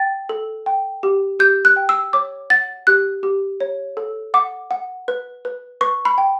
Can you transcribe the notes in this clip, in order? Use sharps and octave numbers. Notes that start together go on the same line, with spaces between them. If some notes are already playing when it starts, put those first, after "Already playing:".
Already playing: G5 A6
A4
G5
G4
G4 G6
F#6
G5
E6
C#5 D6
F#5 A6
G4 F#6
G4
C#5
A4
F#5 D6
F#5
B4
B4
B4 C#6
B5
G5